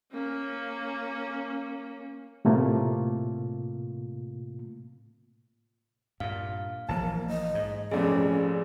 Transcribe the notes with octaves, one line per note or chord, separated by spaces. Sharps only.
A#3 C#4
A2 C3 A3 A#3 F4
G2 A#2 F5
A#1 E3 F#3 A#3 A5
D#5
G#2
F1 A#1 F2 C#4 G#4